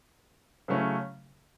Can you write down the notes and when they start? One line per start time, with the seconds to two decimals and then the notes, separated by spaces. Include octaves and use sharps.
0.68 C#3 F#3 A3 C#4 E4